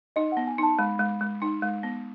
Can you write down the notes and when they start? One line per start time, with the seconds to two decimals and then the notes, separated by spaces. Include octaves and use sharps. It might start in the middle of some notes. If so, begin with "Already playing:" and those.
0.16 D#4 D#5
0.32 B3 F#5
0.47 G#5
0.58 D#4 A5
0.79 G#3 B5
1.00 G#3
1.21 G#3
1.42 D#4
1.62 G#3
1.83 B3